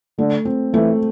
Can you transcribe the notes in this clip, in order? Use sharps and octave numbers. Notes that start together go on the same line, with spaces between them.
D3 A3
C4
E3 A3